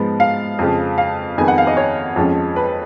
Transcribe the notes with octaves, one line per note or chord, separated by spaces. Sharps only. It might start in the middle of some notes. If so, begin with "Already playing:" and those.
Already playing: G#2 F3 G#3 B3
F5
F2 C#3 F3
F5
F2 D#3 G#3 B3 G#5
F#5
F5
D#5
C#5
F2 F3 G#3 C#4
B4